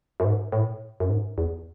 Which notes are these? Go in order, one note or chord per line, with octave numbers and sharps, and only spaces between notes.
F#2
G#2
A2
F#2
G#2
E2